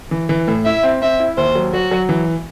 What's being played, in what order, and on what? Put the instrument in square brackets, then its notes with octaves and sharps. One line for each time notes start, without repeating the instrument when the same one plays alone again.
[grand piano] E3
E3
A2
[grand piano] E4 [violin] E5
[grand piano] C4
[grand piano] C4 [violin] E5
[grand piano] E4
[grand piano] D#2 [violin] C5
[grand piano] F#3
[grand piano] F#3 [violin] F#4
[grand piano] F#3
E3